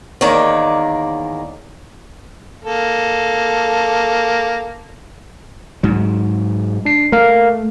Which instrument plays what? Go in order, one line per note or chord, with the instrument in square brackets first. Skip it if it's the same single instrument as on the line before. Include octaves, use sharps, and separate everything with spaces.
[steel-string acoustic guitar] E2 D#3 A#3 C#5 D5
[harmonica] A#3 A4
[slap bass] G#2 F#3
[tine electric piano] D4 C7
[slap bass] A3 [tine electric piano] A#4 F5